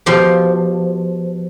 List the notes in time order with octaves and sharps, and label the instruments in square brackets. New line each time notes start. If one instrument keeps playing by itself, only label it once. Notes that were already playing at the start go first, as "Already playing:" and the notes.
[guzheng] B2 F3 F4 G4